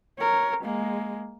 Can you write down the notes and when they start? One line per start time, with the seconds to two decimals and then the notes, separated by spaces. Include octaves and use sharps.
0.19 A#4 C#5
0.64 G#3 A#3